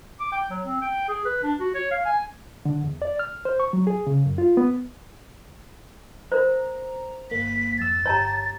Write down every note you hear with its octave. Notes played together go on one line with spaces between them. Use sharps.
D6
G5
F#3
C4
G5
G#4
B4
D4
F#4
C#5
F5
G#5
D3
E2
D5
F6
C5
C#6
F#3
G#4
C#3
F#2
F4
B3
A#4 C5 A#5
G1 A#3 B6
G#1 F2 E6 A6
G1 G4 C#5 A5 A#5